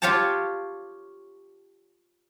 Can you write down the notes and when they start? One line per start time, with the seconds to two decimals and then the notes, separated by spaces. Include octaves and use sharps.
0.02 F4 G4 C#5 G5 A5